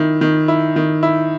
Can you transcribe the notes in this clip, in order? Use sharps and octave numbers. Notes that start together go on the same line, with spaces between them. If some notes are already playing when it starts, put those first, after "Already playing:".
Already playing: D#3 E4
D#3
E4
D#3
E4